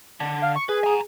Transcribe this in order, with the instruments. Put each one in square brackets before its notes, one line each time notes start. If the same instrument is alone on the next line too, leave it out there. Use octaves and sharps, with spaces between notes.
[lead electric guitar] D3
[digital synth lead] F5
C#6
[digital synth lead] G#4 [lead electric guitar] B4
[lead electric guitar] G#5 A#5